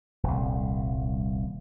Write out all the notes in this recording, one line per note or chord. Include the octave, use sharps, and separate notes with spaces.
D#1 C2